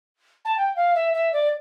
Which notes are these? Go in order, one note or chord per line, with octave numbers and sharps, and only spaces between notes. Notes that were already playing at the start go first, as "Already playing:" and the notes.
A5
G5
F5
E5
E5
D5